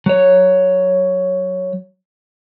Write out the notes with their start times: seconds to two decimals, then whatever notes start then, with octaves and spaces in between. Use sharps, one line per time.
0.06 F#3 C#5